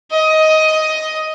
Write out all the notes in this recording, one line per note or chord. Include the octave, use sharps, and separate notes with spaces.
D#5